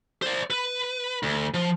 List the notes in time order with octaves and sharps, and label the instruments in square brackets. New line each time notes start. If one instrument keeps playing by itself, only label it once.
[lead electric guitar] C5 D5
B4
D2
F3